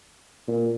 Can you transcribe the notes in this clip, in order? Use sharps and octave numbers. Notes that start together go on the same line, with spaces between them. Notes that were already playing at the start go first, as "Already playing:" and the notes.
A#2